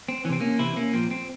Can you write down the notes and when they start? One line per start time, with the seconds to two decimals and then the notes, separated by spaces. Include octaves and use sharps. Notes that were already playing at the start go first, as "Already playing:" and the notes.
0.09 C4
0.25 E3 C#4
0.29 C3 C4
0.41 A#3 C#4
0.59 C3 E3 C4 E4
0.76 A#3 C#4
0.93 A#2 F3 C4
1.11 C4